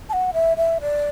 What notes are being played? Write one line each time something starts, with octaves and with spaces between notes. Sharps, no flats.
A5
F#5
E5
E5
D5